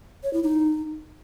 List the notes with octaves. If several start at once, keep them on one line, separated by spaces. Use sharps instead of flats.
C#5
E4
D#4